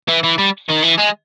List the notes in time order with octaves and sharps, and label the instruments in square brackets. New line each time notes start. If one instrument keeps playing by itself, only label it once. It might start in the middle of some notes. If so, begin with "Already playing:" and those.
[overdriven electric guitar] E3
E3
G3
D#3
E3
G#3